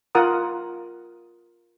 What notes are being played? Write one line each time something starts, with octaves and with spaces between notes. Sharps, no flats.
F4 A#4 F#5 A#5 D#6